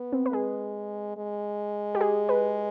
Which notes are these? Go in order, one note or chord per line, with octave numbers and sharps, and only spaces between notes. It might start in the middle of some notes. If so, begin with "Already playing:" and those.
Already playing: B3
C4
B4
G#3 G#4
G#3
G4
G#4
B4